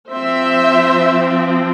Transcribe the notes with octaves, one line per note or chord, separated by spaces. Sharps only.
F3 C4 C5 E5